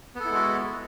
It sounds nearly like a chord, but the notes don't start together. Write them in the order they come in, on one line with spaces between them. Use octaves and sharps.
B3 A4 E4 G#3 F#4